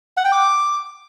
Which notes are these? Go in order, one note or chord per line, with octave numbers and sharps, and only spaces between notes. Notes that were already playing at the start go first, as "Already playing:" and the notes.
F#5
G5
D6